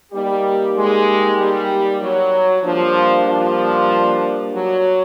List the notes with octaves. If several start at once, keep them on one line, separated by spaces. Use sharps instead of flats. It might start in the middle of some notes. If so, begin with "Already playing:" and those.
G3 A#3 D#4 G4
G#3
G3
F#3
F3 G3 A#3 D4
F3
F#3